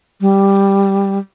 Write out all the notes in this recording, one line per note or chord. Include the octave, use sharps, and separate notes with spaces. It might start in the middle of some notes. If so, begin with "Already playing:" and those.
G3